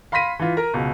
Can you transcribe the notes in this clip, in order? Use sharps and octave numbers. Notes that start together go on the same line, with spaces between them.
F5 B5 C6 A#6 B6 D#7
E3 F4
A#4 A#5
C#2 B2